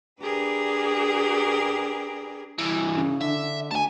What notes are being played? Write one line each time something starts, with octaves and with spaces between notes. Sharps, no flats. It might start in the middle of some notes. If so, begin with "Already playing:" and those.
D4 G4 G#4 A#4 B4
C2 E3
C#3
D3 E5
D2 G#5 A5